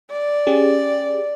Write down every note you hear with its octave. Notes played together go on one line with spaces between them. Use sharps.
D5
C#4 G4 G#4